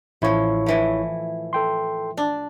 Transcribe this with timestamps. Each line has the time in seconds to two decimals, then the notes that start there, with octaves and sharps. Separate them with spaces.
0.22 A1 A2 F3 E4 C#5
0.66 A2 E3 F3
1.53 A4 G5 C6
2.17 D4